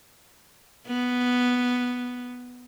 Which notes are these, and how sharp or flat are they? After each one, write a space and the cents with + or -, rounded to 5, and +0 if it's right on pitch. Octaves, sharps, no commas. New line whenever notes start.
B3 +0